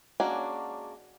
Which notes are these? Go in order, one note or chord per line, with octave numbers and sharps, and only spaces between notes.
G#3 A#3 C#4 D4 F#4